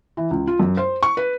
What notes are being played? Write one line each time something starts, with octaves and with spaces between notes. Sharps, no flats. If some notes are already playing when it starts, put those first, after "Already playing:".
E3
C#2
F4
F#2
C5
C#6
B4